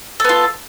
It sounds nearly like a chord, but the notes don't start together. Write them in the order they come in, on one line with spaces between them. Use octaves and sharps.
A4 B3 F4